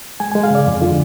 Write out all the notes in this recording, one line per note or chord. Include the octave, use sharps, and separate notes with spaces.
G#3 G#5
G#5
G#3
F5
C#3 D5
F2
D3 F4